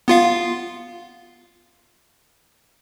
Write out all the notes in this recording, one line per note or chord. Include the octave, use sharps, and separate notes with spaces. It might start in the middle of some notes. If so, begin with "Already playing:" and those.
B3 F4 F5